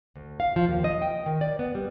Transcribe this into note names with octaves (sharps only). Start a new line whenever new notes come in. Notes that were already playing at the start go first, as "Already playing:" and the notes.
D2
F5
F3
D#2
D#5
G5
D#3
D5
B3
G3